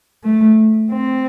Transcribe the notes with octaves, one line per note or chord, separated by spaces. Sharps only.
A3
C4